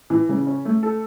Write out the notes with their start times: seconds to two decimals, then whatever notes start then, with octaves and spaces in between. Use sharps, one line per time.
0.10 E3
0.29 C#3
0.47 C#4
0.65 A3
0.83 A4